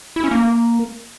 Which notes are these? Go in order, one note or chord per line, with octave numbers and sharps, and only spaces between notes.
E4
C#4
A#3